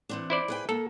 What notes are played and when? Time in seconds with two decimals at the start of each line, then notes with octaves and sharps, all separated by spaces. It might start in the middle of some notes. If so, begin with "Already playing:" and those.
0.09 E3 C4 D4
0.30 E4 C5 D5
0.48 G#4 B4 G5
0.69 A#3 A4